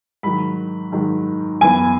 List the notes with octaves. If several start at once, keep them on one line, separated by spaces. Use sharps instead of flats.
G#2 D#3 F#3 B5
G#2 D#3 F#3
F#2 E3 B3 E4 G#5